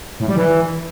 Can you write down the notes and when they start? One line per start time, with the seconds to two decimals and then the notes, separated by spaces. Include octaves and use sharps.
0.20 A2
0.28 G3
0.36 E3